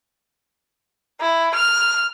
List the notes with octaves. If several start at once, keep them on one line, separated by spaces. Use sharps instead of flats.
E4
F6